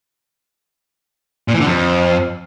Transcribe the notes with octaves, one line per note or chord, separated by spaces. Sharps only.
A#2
E3
D3
F2